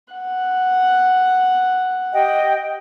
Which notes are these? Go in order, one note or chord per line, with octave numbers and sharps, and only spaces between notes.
F#5
G4 D#5 G5